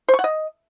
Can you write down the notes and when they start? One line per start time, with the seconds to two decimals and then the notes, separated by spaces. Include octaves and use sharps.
0.08 C5
0.14 C#6
0.19 F#5
0.24 D#5